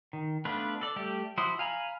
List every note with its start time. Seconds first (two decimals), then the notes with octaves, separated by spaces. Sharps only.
0.13 D#3
0.45 A3 B3 D4 F4 B4
0.81 A4 D5
0.96 G3 A3 G4
1.38 F3 E4 F#4 C6 D#6
1.59 F5 G#5 A#5 B5